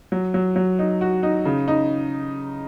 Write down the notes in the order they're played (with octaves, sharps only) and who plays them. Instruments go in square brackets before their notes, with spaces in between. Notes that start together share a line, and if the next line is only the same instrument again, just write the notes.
[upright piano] F#3
F#3
F#3
D#4
F#4
D#4
C#3
D#4